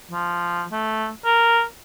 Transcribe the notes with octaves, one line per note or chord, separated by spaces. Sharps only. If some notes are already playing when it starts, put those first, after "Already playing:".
F3
A3
A#4